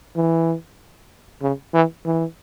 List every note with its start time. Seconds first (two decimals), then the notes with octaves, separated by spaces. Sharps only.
0.16 E3
1.42 C#3
1.74 E3
2.05 E3